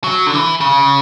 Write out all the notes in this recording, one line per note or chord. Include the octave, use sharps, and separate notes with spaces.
F#3
D3
E3
C#3